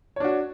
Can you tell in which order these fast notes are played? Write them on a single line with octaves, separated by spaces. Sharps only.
C#5 D4 F#4